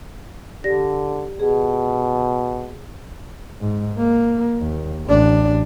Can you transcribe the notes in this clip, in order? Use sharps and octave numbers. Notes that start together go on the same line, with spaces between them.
D3 G4 D5 A#6
B2 G#4
G#2
A#3
D#2
A1 D4